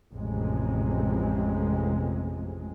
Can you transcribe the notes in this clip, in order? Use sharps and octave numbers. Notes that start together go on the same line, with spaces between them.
A1 F2 C3 G#3